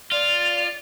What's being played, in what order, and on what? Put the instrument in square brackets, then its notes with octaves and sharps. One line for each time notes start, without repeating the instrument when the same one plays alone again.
[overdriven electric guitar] F4 [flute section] D5 [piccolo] F7